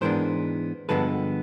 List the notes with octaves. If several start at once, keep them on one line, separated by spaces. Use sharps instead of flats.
G#2 E3 G#3 B3 D4 A#4 C5
G2 D3 F3 G#3 B3 A4 B4